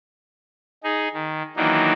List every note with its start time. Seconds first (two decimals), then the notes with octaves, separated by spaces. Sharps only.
0.84 D#4 G#4
1.14 D#3
1.57 D#3 E3 F#3 A#3 D4 D#4